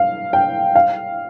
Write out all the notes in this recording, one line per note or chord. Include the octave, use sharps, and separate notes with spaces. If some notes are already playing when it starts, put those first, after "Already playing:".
Already playing: F5
G5
F5